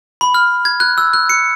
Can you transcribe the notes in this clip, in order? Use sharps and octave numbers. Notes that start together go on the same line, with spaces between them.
B5
F6
G#6
F#6
E6
F#6
C#7